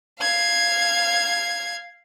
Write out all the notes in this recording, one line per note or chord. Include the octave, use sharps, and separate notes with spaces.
F5 G#6